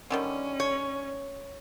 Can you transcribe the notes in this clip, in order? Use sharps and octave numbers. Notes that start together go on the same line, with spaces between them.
D3 D#3 G3 C#4
C#5